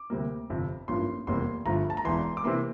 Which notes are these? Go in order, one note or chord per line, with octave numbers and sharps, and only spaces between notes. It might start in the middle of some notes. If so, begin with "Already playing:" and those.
Already playing: D6
D2 C3 G3 A#3
G1 F2 C3
A1 G2 F3 A#3 C6
F1 E2 C3 G3 A#3 C6
G1 G2 F3 A3 A#5
A5
A#5
E1 E2 E3 C6
D6
C3 E3 A#3 C6